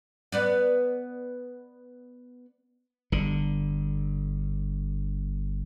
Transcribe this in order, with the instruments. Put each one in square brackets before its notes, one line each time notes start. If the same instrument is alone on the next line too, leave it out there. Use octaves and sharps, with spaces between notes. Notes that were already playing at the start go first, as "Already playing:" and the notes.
[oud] B3 B4 D5
[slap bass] G1 D3